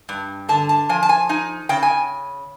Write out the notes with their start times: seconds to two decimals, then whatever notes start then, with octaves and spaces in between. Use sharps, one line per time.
0.09 G2
0.49 D3 A5
0.69 A5
0.89 F3 G#5
1.03 A5
1.09 G#5
1.29 D#4 G#5
1.69 C#3 G5
1.83 G#5